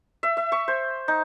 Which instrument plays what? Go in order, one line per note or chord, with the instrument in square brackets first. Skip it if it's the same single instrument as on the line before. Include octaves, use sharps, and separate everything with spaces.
[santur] E5
E5
C#6
C5
D#4